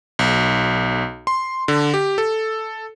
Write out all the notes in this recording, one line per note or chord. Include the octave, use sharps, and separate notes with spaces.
B1
C6
D3
G4
A4